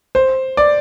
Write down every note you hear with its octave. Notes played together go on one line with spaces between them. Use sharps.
C5
D5